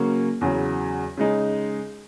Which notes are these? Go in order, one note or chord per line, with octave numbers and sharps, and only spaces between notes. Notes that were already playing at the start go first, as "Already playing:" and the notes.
Already playing: C#3 F#3 A#3 C#4
E2 C#3 F#3
C#3 G#3 D#4